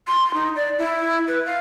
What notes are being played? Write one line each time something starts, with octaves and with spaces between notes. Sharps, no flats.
C6
D#4
D5
E4
B4
F5